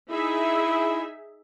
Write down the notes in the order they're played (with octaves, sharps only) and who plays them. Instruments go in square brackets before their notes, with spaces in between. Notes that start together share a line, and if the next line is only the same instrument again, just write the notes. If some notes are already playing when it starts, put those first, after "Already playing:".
[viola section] D#4 G#4 E5 [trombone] E4